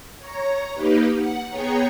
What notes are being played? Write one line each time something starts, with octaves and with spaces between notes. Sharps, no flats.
C#5 A#5
A#3 D#4 G4 B4
F#5
B3 G#4 C#5 G5 A#5 C#7